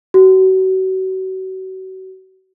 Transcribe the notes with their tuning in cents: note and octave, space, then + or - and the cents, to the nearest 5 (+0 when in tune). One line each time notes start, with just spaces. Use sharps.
F#4 +35